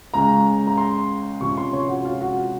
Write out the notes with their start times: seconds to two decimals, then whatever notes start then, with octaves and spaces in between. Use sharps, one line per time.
0.14 C#2 C#3 G#3 C#4 A#5
0.67 A#5
0.77 C6
1.41 C#2 C3 F3 G#3 C#4 C#6
1.57 C6
1.73 C#5
1.89 F#4
2.05 F4
2.21 F#4